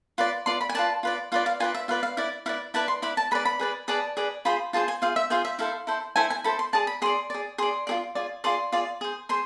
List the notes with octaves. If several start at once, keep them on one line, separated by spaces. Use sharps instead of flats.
F4 B4 D5
F4 B4 D5 C6
B5
G#5
F4 B4 D5 A5
F4 B4 D5
F4 B4 D5 F5
F5
F4 B4 D5 G#5
E5
F4 B4 D5 F5
F5
E4 B4 D5
E4 B4 D5 F5
E4 B4 D5 A5
C6
E4 B4 D5 B5
A5
G#4 B4 D5 B5
B5
G#4 B4 D5
G#4 B4 D5 A5
G#4 B4 D5
F4 G#4 C5 B5
F4 G#4 C5 A5
G#5
F4 G#4 C5 F5
E5
F4 G#4 C5 F5
E5
E4 A4 C5 F5
E4 A4 C5
E4 A4 C5 G#5
G#5
E4 A4 C5 B5
C6
G#4 D5 A5
B5
G#4 D5 C6
G#4 D5
G#4 D5 C6
F4 G#4 D5
F4 G#4 D5
F4 G#4 D5 C6
F4 G#4 D5
G#4 C5
G#4 C5 C6